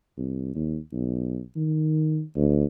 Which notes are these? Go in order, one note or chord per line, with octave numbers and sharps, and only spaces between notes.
C2
D#2
B1
D#3
D2